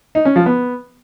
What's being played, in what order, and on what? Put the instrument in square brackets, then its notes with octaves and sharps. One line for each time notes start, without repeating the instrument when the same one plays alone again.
[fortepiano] D#4
C#4
F3
B3